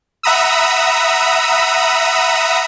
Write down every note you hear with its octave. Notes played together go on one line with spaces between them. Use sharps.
E5 F#5 A#5 B5 D#6 E6